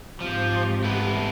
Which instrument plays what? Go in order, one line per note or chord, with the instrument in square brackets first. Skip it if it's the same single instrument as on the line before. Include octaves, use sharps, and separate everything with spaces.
[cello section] G#2 C4 G4 [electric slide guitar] F3
[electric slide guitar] A3 B3 E4